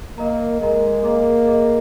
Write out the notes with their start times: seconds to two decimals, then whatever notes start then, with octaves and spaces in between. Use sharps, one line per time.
0.18 A#3 A#4 D#5 A#5
0.61 G#3 A#4 D#5 A#5
1.04 A#3 G#4 D#5 A#5 D6
1.46 G#4 D#5 A#5 D6